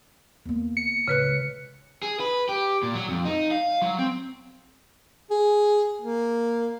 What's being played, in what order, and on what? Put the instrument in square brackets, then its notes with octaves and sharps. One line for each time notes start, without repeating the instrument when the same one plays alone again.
[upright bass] E2 A#3
[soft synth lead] C#7
[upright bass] C#2 A2 [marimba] C#3 B4 F#6
[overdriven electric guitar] G#4
B4
G4
A#2
F#3
F2
D#4
F5
F#3
C4
[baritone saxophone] G#4
A#3